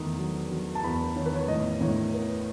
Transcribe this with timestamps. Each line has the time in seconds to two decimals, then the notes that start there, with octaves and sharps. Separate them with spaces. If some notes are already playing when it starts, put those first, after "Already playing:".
Already playing: E2 D#3 A3 D#6
0.19 F#3
0.51 F#3
0.75 A5
0.84 E2 B5
1.16 D#3 C#5
1.26 B4
1.35 C#5
1.48 A2 D#5
1.81 A2 C#5
2.13 B3 B4